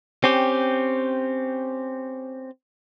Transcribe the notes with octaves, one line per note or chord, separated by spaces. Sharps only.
C4 C#4 G4